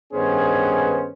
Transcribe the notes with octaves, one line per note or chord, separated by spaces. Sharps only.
G2 D#3 B3 C#4 G#4 C5